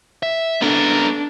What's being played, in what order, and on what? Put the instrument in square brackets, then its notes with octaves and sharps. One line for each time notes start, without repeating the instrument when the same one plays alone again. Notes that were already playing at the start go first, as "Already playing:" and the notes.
[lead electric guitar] E5
[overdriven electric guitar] C#2 A#4 [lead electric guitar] B3 A4 [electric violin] D4